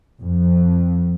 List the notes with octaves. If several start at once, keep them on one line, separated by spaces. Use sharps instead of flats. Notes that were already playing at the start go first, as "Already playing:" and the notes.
F2